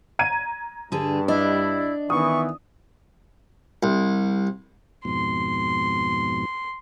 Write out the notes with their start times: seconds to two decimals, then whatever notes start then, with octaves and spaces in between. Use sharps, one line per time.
0.19 A#5 G#6 D#7
0.92 G2 D3 G#4 A5
1.28 D4 E4 D#5
2.10 D#3 E3 B3 C#6 D#6
3.83 C2
5.05 F2 G#2 B2 C6